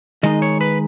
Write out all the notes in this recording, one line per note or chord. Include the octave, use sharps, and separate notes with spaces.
D#3 G#3 D#4 D#5
C#5
B4